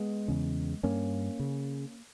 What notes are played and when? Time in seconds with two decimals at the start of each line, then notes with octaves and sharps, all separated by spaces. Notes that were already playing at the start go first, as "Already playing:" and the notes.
Already playing: G#3 B3
0.28 E2 C#3
0.83 G2 A#3 C#4
1.40 C#3